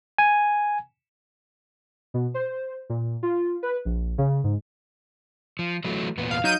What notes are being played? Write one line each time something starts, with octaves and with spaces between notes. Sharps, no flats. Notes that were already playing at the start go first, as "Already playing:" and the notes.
G#5
B2
C5
A#2
F4
B4
A#1
C#3
G#2
F3
E3 F#3 A3
E2 A#2 B3
F5
F#3 D#4 G6 D#7